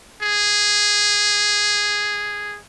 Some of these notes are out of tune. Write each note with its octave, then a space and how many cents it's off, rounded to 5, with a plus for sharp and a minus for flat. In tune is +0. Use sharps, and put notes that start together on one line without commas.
G#4 -5